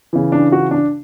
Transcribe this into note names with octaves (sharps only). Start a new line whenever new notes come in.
C#3 E3
D4
F#4
D4